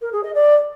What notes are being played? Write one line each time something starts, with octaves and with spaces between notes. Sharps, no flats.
A#4
G#4
D#5
D5